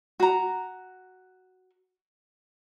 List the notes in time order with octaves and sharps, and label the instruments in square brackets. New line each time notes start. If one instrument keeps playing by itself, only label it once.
[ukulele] F#4 A#5